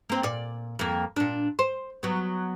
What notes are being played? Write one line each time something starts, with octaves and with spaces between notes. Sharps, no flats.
A#3 C4
A#2 D5
F2 A#3
A#2 D4
C5
F#3 B3